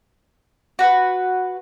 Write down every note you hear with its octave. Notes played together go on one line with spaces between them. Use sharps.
F#4 B4